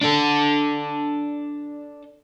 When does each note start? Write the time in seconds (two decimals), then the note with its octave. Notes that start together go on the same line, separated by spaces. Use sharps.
0.01 D4 A4